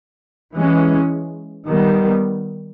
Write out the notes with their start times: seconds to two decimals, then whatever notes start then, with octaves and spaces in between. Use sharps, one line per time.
0.54 E3 G#3 C#4
1.68 D#3 G3 B3